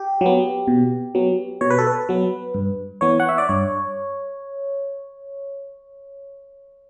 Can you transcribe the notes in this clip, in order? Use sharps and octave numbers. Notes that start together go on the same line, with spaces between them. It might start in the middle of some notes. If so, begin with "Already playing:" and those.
Already playing: G4
F#3 B3
B2
F#3 B3
B2 C#5
B4
A4
B4
F#3 B3
G2
E3 B3 C#5
F#5
E5
D5
G2 C#5